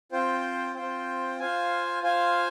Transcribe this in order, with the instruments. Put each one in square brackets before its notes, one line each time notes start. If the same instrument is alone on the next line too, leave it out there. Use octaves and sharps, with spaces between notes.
[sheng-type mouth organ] C4 F4 C5 G5
C4 F4 C5 G5
F4 C5 F5 G#5
F4 C5 F5 G#5